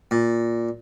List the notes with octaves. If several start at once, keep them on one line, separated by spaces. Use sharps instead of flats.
A#2